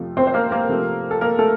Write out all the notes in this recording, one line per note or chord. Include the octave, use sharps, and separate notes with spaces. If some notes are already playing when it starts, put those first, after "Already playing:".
Already playing: F2 C3 F3 A3
C4 C5
C5
A#3 A#4
A#3 A#4
C3 F3 A3
A4
A#3 A#4
A3 A4